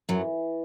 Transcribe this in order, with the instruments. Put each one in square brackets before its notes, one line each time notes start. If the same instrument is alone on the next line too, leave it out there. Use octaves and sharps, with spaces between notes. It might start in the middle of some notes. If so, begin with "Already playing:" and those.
[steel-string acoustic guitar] F#2 F#3 [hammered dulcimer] E3